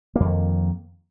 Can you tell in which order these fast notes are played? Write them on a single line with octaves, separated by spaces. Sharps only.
A#3 F2 D#3